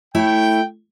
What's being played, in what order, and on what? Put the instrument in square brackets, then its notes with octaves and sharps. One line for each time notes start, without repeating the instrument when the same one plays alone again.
[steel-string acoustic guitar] A3 E4 C#5 [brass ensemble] G5